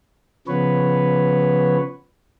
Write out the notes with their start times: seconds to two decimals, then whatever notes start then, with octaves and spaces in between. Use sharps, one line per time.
0.48 C#3 F3 B3 B4 C#5